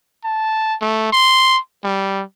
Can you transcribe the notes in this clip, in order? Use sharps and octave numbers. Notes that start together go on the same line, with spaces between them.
A5
A3
C6
G3